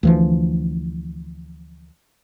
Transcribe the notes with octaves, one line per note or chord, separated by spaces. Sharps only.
D2 E3 F3